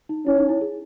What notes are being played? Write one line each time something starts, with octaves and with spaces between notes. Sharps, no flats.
D#4
C#4 E4
D#4
E4
G#4